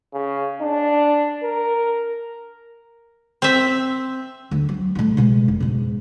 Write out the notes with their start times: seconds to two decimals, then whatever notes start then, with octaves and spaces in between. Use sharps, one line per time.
0.13 C#3
0.61 D4
1.43 A#4
3.42 C4 E5
4.51 D2
4.69 F#3
4.95 A2 F3
5.17 B2 G#3
5.48 F1
5.60 G#2 B2